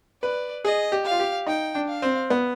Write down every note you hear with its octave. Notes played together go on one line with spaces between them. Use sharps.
B4 D5
G#4 D#5
G4
F5
F4
G4
D#4 G5
D4
F5
C4
B3